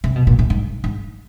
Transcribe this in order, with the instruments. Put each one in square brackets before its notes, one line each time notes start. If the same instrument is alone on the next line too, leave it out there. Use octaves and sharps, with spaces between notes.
[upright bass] C3
B2
A#2
A2
G#2
G#2